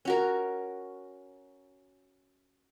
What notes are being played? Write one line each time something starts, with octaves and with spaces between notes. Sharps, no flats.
C#4 F#4 A#4